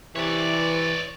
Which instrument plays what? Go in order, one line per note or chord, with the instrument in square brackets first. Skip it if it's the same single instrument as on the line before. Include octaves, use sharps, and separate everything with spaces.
[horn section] C3 E3 [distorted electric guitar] C#5 D5